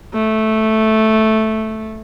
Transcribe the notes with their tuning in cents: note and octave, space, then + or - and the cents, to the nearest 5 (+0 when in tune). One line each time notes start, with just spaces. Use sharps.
A3 -5